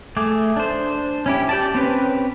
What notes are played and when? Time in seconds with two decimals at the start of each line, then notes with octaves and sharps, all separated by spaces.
0.17 A3 G#4 D6
0.57 D4 C5
1.26 C#4 E4 G4
1.49 G4 D5 A5
1.75 C4 C#4 B4